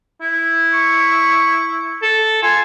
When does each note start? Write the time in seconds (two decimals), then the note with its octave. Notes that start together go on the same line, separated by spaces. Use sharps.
0.21 E4
0.74 C#6
2.02 A4
2.43 F4 G#5